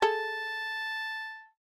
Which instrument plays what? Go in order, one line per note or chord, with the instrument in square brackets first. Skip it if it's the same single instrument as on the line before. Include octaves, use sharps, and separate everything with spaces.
[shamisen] G#4 A4 [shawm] A5